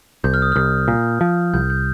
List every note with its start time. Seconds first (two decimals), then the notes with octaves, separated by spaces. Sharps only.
0.24 C2 G6
0.34 F6
0.42 D#6
0.52 C2 F6
0.88 A#2
1.21 F3
1.54 C2 G6
1.70 G6